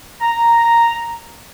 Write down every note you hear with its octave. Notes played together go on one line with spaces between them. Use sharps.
A#5